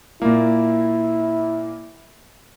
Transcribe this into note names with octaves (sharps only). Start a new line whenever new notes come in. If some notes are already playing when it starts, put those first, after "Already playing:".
A#2 A#3 E4